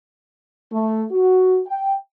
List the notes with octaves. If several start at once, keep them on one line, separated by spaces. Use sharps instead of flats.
A3
F#4
G5